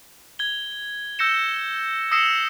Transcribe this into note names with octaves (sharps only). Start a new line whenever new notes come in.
G#6 G7
E6 G6 A#6 C#7 E7
D#6 E6 A#6 C7 C#7 E7